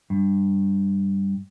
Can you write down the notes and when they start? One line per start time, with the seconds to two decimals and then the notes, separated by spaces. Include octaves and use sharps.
0.10 G2